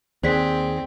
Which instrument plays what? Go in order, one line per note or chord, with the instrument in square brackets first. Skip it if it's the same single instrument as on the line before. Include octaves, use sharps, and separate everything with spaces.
[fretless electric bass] D#2 [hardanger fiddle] C4 [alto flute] G#4 [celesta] C5 D5 B6